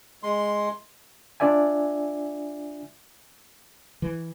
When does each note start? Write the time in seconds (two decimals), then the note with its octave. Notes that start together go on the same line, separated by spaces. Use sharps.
0.23 G#3 C6
1.40 D4 F4 D5 E5 G#5
4.02 E3